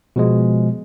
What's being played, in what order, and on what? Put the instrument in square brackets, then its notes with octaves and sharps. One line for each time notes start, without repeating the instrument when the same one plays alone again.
[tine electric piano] B2 F3 G#3